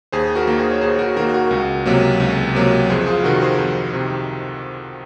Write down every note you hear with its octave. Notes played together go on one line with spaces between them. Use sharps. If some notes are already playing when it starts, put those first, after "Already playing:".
D#2 G#4 C5
F#4 A#4
D#3 A#3
G#4 C5
C#5
D#2 G#4 C5
F#4 A#4
D#3 A#3 F#4 A#4
F#4 A#4
C#2
C3 F#3 A#3
C#2
C3 F#3 A#3
F2 G#4 C5
F4 G#4
C3 D#3 F#4 A#4
G#4 C5
F2
C3 D#3